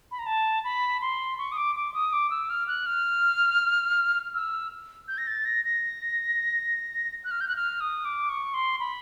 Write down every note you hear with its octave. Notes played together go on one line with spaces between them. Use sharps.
B5
A#5
A5
B5
C6
C#6
D#6
D6
D6
D#6
D6
E6
F6
F#6
F6
E6
G6
A#6
A6
A#6
A#6
F#6
F6
G6
F#6
F6
D#6
D6
C#6
C6
B5